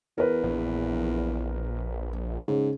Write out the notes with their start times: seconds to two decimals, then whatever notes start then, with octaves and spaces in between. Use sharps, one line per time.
0.18 E2 A#4 B4
0.44 A#1
2.48 G#2 C#3